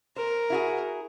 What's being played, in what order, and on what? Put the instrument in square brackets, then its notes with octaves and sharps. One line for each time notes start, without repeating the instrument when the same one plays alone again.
[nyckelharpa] A#4 [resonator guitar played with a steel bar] C5
[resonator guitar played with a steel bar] E4 F#4 G#4